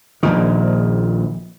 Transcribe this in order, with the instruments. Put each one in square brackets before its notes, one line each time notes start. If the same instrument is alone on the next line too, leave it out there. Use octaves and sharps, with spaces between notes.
[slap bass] A#1 A#2 D#3